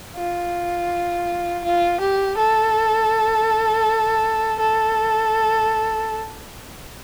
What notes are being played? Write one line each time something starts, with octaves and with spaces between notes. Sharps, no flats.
F4
F4
G4
A4
A4